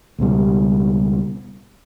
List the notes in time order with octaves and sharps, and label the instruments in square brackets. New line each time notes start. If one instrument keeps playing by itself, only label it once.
[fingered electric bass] C#2 B2 G3